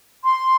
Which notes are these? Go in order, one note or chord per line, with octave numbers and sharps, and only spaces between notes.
C6